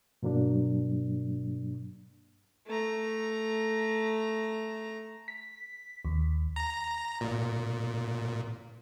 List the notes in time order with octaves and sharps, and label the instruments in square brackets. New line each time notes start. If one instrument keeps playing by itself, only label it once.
[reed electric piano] G2 B2 F#3 A#3 D4
[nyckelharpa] A3 A#5
[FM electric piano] B6
D#2
[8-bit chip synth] A#5
A#2